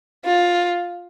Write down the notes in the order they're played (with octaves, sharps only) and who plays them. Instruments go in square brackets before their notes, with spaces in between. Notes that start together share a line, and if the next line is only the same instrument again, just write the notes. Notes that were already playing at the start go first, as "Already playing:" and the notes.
[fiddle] F4